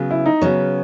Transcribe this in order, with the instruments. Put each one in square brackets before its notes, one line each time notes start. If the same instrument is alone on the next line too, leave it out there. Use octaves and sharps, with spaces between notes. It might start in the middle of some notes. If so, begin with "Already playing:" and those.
Already playing: [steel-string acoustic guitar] C#3 F#3 B3
[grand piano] E4
D#4
[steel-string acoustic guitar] C#3 F#3 B3 [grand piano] C#4